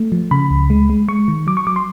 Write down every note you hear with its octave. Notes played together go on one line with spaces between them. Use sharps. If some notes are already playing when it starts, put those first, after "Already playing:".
Already playing: A3
F3
C#3 B5
C#2
G#3
G#3
G#3 C#6
D#3
F#3 D6
C#6
F#3 D6
C6